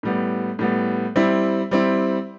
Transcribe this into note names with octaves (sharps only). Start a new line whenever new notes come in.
A2 G3 B3
A2 G3 B3
G3 C4 E4
G3 C4 E4